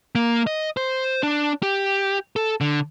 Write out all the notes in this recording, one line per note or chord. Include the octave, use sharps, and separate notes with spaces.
A#3
D#5
C5
D4
G4
A4
D3